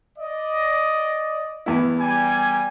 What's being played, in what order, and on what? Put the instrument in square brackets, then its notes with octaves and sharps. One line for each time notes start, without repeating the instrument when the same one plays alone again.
[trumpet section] D5 D#5
[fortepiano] E2 E4
[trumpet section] G3 G#5